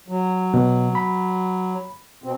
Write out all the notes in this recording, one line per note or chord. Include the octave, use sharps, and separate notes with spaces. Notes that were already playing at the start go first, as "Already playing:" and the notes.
F#3
B2
B5
B2 C4